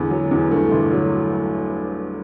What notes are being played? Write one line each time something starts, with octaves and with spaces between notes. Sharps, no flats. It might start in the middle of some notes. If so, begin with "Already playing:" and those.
Already playing: E2 D3 B3
F#3
E2
G2 A3
G1
F#3